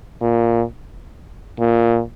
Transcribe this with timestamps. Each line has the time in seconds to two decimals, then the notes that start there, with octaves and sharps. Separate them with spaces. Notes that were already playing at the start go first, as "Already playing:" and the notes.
0.22 A#2
1.60 A#2